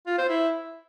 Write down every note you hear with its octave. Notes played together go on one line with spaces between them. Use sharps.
F4
C5
E4